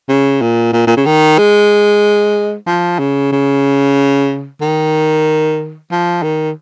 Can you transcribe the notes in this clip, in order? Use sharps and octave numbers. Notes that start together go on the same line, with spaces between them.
C#3
A#2
A#2
A#2
C#3
D#3
G#3
F3
C#3
C#3
D#3
F3
D#3